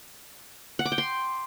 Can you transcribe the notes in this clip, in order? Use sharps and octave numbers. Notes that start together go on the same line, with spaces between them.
F#5
D6
G5
C6